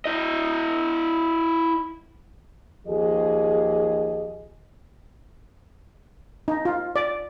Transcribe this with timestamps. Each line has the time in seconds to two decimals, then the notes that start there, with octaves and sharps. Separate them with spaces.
0.05 E4 D#5
2.87 D#2 F3 G4 G#4 D#5
6.48 D#4
6.65 F4
6.96 D5